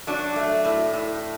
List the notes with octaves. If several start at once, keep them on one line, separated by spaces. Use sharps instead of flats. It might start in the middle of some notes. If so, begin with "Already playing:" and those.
F#3 D4
A3
A2
A2